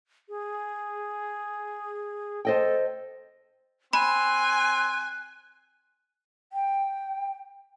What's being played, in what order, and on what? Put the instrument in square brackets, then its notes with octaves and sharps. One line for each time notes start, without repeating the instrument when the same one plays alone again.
[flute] G#4
[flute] A4 [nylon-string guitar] C5 D#5 G5
[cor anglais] C4 [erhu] G#5 [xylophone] B5 [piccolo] F#6
[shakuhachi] G5